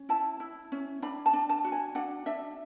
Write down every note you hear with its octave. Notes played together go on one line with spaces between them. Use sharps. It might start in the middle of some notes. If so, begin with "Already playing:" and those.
Already playing: C#4
E4 A5
E4
C#4
D4 B5
A5
D4
A5
F#4
G#5
D4 F#5
D4 E5